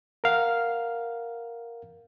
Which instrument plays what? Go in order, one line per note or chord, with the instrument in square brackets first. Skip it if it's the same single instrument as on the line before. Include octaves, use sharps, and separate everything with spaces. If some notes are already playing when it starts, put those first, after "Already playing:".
[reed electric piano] A#4 F5 F#5